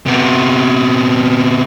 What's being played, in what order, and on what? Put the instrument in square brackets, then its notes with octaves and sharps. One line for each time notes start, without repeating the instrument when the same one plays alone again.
[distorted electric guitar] C3 B3